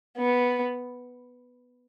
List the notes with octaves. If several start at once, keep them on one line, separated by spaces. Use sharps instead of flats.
B3